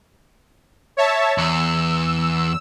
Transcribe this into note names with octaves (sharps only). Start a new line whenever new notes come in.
C#5 E5 A5
E2 E6